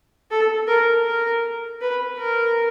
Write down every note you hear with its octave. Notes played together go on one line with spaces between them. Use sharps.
A4
A#4
A#4
B4
A#4